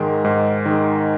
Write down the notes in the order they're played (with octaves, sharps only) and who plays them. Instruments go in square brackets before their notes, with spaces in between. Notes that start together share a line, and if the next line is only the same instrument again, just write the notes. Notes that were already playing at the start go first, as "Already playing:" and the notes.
Already playing: [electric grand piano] G#2 D#3 G#3 A#4
G#2
D#3 G#3